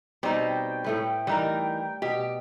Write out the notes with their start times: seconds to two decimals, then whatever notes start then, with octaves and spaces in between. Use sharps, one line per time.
0.23 B2 G3 C4 D#4 G5
0.84 A2 A3 B4
1.27 E3 G3 D#4 A#4
2.02 B2 G4